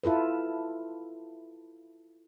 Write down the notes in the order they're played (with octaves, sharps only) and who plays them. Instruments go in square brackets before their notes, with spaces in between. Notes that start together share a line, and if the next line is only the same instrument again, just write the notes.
[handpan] E4 F4 A4 B4